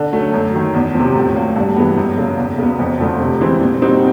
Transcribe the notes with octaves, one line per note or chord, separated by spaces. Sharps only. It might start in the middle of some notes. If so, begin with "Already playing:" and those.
Already playing: D3
F#3 A3 C#4
F#2
D#3 F#3
E2
C3 F3
A2
F#3 A#3 C#4
G2
E3 G#3 B3
F#2
C#3 F#3 A#3
E2
C#3 F#3 B3
F2
D3 F3 A3
C3
E3 G#3 C4
A#2
G3 C4 D#4 F#4